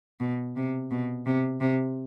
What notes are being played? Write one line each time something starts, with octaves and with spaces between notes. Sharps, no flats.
B2
C3
B2
C3
C3